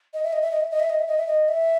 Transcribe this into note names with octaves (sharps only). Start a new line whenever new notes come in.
D#5
E5
D#5
E5
D#5
E5
D#5
E5
D#5
E5
D#5
E5
D#5
E5